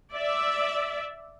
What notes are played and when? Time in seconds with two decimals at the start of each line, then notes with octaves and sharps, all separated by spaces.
0.14 D5 E5